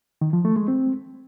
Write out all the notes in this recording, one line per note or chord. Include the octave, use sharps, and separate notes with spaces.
D#3
F3
A3
G#3
C4